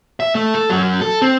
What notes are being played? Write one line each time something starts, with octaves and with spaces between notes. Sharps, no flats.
E5
A3
A4
F#2 F#3
A4
C4